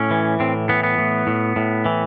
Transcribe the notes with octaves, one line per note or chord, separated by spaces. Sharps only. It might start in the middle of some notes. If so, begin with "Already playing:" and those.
Already playing: A2 C#4
E3
A2 C4
E3 B3
B3
A2
A2
A2
E3